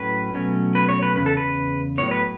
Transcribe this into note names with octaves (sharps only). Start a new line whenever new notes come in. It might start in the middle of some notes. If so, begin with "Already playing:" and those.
Already playing: A2 F#3 A3 C#4 B4
B2 F#3 A3 C#4
B4
C#5
B4
E2 C#3 B4
A4
B4
A2 F#3 B3 C#5
B4